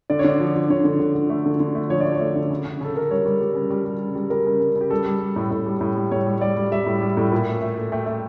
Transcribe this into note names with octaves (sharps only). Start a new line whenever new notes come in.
D3 D5
C#5
D3 D5
F3
F3
D3 C#5
D3
D3
D3
A3
D3
D3
A3
F3 C#5
A3 D5
C#5
A3
D3
C#3
C#3
C#3 A4
C#3 A#4
G3 C#5
G3
G3
C#3
G3
G3
C#3
G3
G3 A#4
C#3
C#3
C#3
G4
G3 A4
G3
G3
A2
A2
G3
A2
G3
A2 C#5
G3
G3 D5
G3
G3 E5
A2
G3
A2
A#2
A3
A3
A3
A3 G5
A3